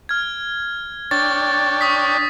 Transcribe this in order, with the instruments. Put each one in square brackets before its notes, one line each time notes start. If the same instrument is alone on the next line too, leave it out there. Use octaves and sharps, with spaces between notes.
[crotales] F6 G#6
[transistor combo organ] D4 C#5 G5 [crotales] A6
[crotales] C#6 D#6 B6